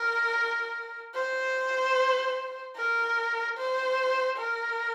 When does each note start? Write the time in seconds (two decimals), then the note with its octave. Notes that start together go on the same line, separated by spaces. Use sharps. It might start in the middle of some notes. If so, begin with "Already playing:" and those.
Already playing: A#4
1.15 C5
2.76 A#4
3.57 C5
4.38 A#4